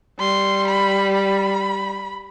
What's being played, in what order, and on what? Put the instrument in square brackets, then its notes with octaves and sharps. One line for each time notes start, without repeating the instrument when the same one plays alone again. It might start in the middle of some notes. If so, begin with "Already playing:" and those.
[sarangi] G3 [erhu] C6
[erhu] B5
B5